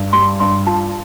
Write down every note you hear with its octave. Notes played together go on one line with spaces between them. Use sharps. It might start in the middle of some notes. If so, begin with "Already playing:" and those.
Already playing: G2
G3 C6
G2 C6
F4 A5